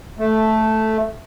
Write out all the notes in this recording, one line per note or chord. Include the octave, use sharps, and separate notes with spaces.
A3